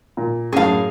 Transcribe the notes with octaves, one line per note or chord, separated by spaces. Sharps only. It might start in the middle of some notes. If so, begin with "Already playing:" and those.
A#2
F#2 A2 G#4 F5